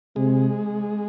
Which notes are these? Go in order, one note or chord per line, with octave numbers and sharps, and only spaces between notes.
C3 G#3